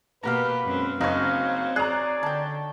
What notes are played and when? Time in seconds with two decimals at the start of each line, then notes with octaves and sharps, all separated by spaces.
0.23 B2 A#3 G4 B4 F5 F#5 A#5
0.64 F#2 G#3 C4
1.01 F#1 C4 D#4 F#4 C#5 F5
1.76 G#4 D5 A#5 F#6
2.23 D3 G5 A5